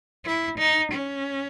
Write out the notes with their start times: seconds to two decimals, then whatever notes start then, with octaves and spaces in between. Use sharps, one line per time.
0.26 E4
0.58 D#4
0.92 C#4